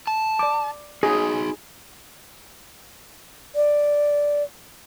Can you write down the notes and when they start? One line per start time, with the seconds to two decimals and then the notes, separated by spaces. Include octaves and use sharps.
0.07 A5
0.39 D5 D6
1.03 D#4 F#4 G#4
3.55 D5